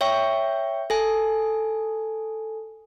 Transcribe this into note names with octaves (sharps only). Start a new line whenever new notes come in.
C#5 E5 G5 C#6
A4 G#5